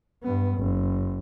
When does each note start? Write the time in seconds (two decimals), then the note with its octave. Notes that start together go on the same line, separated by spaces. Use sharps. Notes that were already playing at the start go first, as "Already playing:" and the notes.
0.23 G2 B3
0.58 F#1